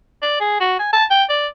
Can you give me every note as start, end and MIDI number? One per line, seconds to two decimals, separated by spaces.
0.22 0.37 74
0.40 0.58 68
0.61 0.76 66
0.79 0.89 80
0.93 1.04 81
1.11 1.24 79
1.30 1.47 74